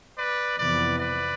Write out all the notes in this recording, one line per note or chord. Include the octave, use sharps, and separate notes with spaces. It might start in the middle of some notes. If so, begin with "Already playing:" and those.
B4 D5
F2 C3 E3 B3 B4 D5
B4 D5